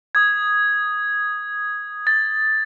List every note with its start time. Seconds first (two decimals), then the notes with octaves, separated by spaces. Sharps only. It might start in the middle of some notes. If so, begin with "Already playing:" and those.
0.15 D#6 G#6
2.07 A6